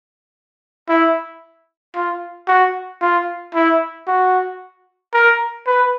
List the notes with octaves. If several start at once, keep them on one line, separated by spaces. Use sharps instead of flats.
E4
F4
F#4
F4
E4
F#4
A#4
B4